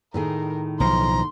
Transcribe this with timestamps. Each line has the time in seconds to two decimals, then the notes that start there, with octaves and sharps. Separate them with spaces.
0.14 A2 D#3 G#4 A#4
0.80 B1 F3 A#5 C6